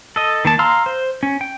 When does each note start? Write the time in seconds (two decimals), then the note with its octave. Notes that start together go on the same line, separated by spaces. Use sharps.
0.16 A4 D#5
0.45 D#3 A#3 A5
0.59 F5 A#5 C6 E6 F6
0.86 C5
1.23 C#4
1.41 G5